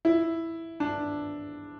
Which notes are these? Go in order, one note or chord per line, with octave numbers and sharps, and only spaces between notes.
E4
D4